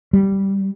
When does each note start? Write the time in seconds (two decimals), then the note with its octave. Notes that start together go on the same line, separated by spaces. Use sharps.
0.13 G3